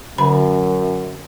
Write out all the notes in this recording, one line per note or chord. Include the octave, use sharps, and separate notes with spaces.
F#2 D3 B5